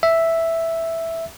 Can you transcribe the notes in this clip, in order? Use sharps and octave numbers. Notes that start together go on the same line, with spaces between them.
E5